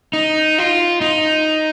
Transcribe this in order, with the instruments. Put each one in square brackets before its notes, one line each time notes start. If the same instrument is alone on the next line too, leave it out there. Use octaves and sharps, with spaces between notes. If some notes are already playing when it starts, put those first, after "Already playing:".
[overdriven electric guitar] D#4
F4
D#4